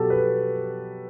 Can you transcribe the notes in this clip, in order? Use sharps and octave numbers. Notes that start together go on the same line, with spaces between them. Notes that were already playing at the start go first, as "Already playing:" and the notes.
Already playing: B2 F#3 F#4 G4 A4
B4